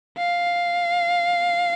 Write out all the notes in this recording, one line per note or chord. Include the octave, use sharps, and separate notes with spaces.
F5